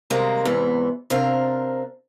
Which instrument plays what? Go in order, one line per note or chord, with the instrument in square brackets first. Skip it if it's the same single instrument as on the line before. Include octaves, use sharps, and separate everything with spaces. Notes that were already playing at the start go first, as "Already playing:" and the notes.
[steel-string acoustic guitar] C3 D#3 G3 G#3 A#3 C4
E2 G#2 C3 E3 B3
C3 C4 D4 A#4 F5